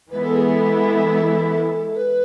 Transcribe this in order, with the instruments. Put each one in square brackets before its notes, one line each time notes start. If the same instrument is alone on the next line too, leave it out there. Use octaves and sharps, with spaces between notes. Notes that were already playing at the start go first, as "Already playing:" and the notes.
[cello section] E3 G#3 B3 E4 [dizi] B4
[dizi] A4
G#4
A4
B4